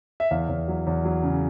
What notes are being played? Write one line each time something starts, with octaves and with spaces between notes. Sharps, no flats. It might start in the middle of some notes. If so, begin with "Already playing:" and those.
E5
E2 F5
E2
F#3
E2
F#3
C#3